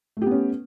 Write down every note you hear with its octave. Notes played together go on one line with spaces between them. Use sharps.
A3 B3 C#4 G4